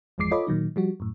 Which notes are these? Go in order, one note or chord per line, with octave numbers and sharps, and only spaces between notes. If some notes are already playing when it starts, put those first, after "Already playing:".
G1 E2 F3 G#3 D6 C7
F4 A4 C#5 D#5 B5 D6
A#2 D#3 F#3 D#4
F3 G3 F#4
F#2 A2